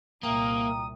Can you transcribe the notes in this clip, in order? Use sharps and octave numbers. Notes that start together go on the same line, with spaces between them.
C2 A#2 A#3 E5 G5 A#5 D#6